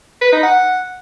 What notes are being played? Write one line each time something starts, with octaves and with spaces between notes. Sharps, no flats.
B4
D#4
F#5